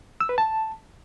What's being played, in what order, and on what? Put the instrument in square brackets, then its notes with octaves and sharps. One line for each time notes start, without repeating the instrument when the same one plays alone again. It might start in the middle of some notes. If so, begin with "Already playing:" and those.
[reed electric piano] E6
B4
A5